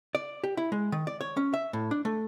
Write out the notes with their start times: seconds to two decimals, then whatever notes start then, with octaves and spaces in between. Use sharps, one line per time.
0.15 D5
0.44 G4
0.57 E4
0.72 G#3
0.92 D#3
1.07 D5
1.21 C#5
1.37 C#4
1.54 E5
1.73 A2
1.91 D4
2.05 A3